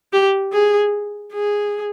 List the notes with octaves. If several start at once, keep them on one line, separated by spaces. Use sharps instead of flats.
G4
G#4
G#4